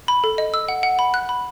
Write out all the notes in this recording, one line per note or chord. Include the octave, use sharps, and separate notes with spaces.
B5
A4
D#5
E6
F#5
F#5
B5
F#6
B5